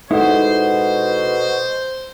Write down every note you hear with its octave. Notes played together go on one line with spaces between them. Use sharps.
B2 G#3 D#4 E4 A4 C5 F#5